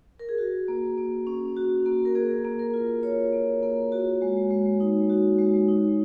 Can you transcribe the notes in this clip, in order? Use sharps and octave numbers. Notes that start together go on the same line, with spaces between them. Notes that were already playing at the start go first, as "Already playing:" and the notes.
A#4
G#4
F#4
A#3
A#3
C#4
F#4
A#3
A#4
A#3 G#4
A#3
A#4
F4
F4 C#5
A#3
A#3
F#4
G#3
G#3
D#4
F#4
G#3
D#4